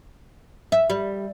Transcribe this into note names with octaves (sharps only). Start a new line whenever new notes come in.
E5
G3